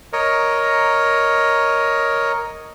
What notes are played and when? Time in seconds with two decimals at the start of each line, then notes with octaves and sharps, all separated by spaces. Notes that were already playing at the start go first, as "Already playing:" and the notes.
0.13 A#4 C#5 D#5